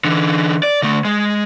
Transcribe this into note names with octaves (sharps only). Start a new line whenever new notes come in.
D3 E3
D5
D3 A3
G#3